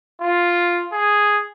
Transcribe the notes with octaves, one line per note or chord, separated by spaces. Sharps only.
F4
G#4